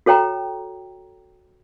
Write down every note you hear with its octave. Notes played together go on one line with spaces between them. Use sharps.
F#4 A4 C#5 G5 A#5